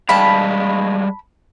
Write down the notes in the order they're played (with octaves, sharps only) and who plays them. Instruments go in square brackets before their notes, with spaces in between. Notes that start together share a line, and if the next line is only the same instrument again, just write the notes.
[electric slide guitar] G3 G#3 F5 [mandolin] A5 B5